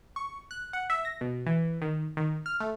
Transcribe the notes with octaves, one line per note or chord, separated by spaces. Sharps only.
C#6
F#6
F#5
E5
A#6
B2
E3
D#3
D#3
F6
A3